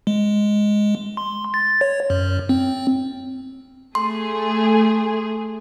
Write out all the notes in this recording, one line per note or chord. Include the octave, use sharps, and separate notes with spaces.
G#3
C6
A6
C#5
F#2
C4
A3 G#4 C6